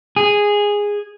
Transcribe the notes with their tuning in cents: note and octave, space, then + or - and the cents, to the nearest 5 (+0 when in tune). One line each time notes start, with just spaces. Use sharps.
G#4 -10